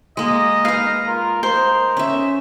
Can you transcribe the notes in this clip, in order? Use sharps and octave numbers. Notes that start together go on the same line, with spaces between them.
G#3 A#3 D#5
D#4 B4 F5 A#5
F4 A#4
D#4 A#4 C5
C#4 E5